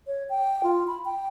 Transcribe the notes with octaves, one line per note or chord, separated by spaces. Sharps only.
C#5
G5
F4
B5
G5